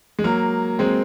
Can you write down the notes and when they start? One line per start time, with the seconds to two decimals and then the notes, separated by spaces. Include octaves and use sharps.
0.19 G#3
0.24 F#3 A#3
0.79 G#3 C4